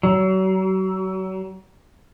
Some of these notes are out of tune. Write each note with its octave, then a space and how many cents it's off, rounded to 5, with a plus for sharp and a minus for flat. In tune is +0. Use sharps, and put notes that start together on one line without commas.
F#3 +35